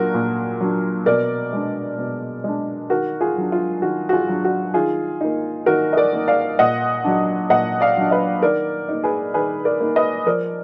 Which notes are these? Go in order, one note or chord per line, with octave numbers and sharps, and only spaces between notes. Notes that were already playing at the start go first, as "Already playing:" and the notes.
Already playing: A#2 F#3 D4 F4 F#4 A#4
A#2
F#3 D4
B2 A#4 D5
G#3 D4
B2
G#3 D4
D#3 F#4 A#4
F4 G#4
F#3 D4
F4
D#3 F#4
F#4
F4 G#4
F#3 D4
F#4
D#3 F4 G#4
A#3 D#4
D#3 F#4 A#4
D#5
A#4 D5
A#3 D#4
D5 F5
A#2 D#5 F#5
F#3 D4
A#2 D#5 F#5
D5 F5
F#3 D4
B4 D#5
D#3 A#4 D5
A#3 D#4
G#4 B4
D#3 G#4 B4
A#4 D5
A#3 D#4
B4 D#5
F3 A#4 D5